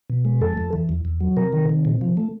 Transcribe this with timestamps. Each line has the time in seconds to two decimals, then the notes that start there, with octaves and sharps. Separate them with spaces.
0.10 B2
0.25 G#3
0.41 F2 A4
0.57 F2
0.73 E3
0.89 E2
1.05 E2
1.21 F#3
1.37 C3 A#4
1.53 D#3
1.69 C3
1.85 A#2
2.01 F3
2.17 A3